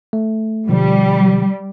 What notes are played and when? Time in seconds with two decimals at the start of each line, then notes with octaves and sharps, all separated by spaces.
0.13 A3
0.69 B2 D3 F3 G3